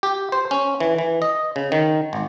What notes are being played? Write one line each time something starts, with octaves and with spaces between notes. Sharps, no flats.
G4
C5
C#4
E3
E3
D#5
C#3
D#3
G#1